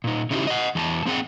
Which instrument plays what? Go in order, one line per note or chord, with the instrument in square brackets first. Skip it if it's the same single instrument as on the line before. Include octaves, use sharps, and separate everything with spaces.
[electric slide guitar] A#2 D#4
C#3 C#4 D#4 E4 F#4 G4
D#5 F#5
E2 G#5 A5
A#3 C4 G#4 F#5 G5